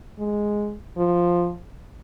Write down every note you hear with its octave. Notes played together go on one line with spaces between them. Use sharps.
G#3
F3